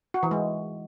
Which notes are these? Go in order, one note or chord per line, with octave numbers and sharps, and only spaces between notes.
F#4
E3
G#3